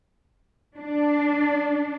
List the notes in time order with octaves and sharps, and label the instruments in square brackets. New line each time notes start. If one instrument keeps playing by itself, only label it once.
[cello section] D4